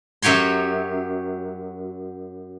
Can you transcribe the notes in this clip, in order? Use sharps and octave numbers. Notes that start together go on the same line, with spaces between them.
F#2 F#3 G4 C#5 C6